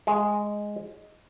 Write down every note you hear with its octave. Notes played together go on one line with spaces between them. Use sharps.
G#3